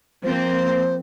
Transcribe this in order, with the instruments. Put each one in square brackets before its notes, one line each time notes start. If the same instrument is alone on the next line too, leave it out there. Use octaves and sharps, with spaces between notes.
[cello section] F3 A#3 C4 [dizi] C5